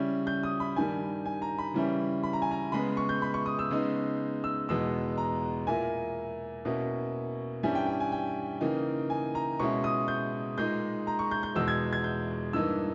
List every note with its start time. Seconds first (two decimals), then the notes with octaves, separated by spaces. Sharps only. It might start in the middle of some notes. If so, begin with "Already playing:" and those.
Already playing: C#3 G3 C#4 E4
0.27 G6
0.43 D#6
0.60 B5
0.76 G2 D#3 G3 G#5
1.26 G#5
1.42 A#5
1.58 B5
1.74 C#3 E3 G3 C#4 E4
2.23 B5
2.33 A#5
2.42 G#5
2.51 A#5
2.72 C#3 G#3 B3 B5
2.97 C#6
3.09 G6
3.22 B5
3.34 C#6
3.46 D#6
3.59 E6
3.71 C#3 G#3 B3 D#4
4.44 E6
4.69 E2 B2 G#3 B3 E6
5.18 A#5
5.67 A#2 A#3 E4 G#5
6.65 B2 A#3 C#4 E4
7.63 G2 E3 G3 C#4 E4 G#5
7.75 G5
7.87 G5
8.00 G#5
8.12 G5
8.61 C#3 E3 A#3 D#4
9.10 G#5
9.35 A#5
9.60 B2 G#3 C#4 E4 C#6
9.84 D#6
10.08 G6
10.58 A#2 G#3 D#4 G6
11.07 A#5
11.19 C#6
11.31 G6
11.43 G6
11.55 E2 B2 G#3 E6
11.68 G#6
11.93 G#6
12.04 G6
12.53 G2 E3 A#3 D#4 E6